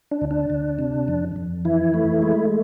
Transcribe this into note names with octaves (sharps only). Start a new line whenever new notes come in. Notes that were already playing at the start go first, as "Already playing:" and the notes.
D4
D2
D4
D2
C3
F2
F2
E3 E4
A3
G#3